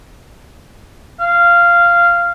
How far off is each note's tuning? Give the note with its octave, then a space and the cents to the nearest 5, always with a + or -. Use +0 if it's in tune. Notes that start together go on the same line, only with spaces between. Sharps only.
F5 -10